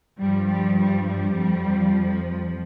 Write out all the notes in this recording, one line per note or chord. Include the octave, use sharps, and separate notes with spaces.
G2 F3 G3
G3
G3
G3
F2 F3